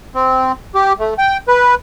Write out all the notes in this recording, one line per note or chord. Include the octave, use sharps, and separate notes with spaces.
C4
G4
A3
G5
B4